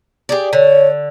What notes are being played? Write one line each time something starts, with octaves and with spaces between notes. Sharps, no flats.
G4 G#4 D5
D3 C#5